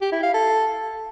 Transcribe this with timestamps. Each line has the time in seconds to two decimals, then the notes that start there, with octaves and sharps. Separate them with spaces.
0.01 G4
0.12 E4
0.23 F5
0.34 A4